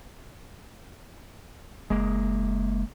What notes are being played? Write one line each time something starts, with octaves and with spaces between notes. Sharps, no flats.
F#1 G#3 A#3